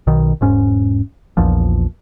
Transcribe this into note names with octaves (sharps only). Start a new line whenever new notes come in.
B1 B2 D#3
E1 G#2 C#4
A#1 E2 A#2 F3